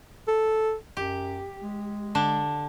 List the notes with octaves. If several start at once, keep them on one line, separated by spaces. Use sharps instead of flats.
A4
F#2 G4
G#3
D3 D4